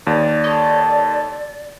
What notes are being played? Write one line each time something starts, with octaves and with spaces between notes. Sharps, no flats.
D#2 D5
A4 C#5 D#5